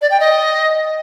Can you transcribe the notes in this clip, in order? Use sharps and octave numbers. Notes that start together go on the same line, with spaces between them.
D5
G5
D#5